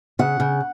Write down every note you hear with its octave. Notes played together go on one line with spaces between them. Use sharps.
C#3 F#5
C#3